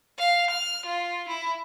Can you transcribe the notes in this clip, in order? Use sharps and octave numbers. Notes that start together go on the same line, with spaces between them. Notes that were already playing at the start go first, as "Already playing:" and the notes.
F5
F6
F4
E4